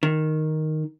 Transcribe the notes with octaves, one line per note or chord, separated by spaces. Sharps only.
D#3